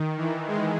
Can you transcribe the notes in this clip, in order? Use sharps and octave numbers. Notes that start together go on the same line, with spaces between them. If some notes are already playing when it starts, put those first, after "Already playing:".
Already playing: D#3
E3
G#3